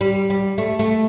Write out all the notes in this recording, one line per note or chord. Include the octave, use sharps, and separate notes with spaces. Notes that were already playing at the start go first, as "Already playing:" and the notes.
G3
G3
A3
A3